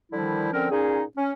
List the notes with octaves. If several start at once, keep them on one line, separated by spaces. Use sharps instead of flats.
D3 D#3 F3 G3 E4
D3 F3 C4 C#4 A#4
A#2 C#4 D#4 G#4
C#4